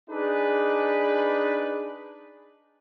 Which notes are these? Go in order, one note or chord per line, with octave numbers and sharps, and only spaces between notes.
D4 D#4 G#4 B4